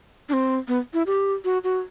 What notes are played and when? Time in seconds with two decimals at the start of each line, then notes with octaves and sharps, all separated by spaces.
0.29 D4
0.33 C4
0.68 B3
0.94 E4
1.07 G4
1.45 F#4
1.64 F#4